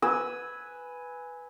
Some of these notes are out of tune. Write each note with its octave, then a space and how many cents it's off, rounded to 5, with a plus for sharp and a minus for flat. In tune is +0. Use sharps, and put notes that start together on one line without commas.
B4 +0 G#5 +0 E6 -20